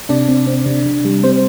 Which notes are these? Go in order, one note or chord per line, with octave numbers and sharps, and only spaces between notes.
C3 D4 D5
C4
C4
C3
C3
G3
G3 C4 C5